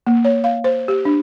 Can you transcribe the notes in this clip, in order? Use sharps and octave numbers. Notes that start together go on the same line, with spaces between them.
A#3
C#5
F5
C5
G4
D4